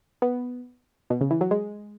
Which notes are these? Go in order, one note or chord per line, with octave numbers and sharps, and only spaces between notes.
B3
B2
C#3
E3
F#3
G#3